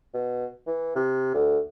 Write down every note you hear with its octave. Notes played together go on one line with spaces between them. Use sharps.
B2
E3
C3
D2